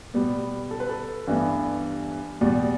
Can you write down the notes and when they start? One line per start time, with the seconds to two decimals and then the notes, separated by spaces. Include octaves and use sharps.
0.14 B2 G3 B3
0.71 A4
0.80 B4
0.89 A4
1.27 G2 E3 G3 B3
2.41 E2 B2 G3